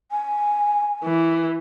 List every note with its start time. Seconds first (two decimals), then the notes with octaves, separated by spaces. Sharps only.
0.11 G#5
1.05 E3